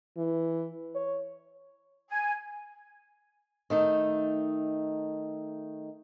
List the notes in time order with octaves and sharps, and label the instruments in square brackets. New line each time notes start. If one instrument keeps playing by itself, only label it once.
[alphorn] E3
C#5
[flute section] G#5
[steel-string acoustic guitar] D#3 A3 D#4